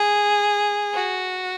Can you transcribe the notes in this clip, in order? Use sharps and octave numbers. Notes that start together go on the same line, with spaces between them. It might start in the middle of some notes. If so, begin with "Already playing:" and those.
Already playing: G#4
F#4